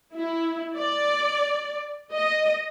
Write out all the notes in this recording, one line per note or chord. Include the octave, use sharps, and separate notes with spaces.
E4
D5
D#5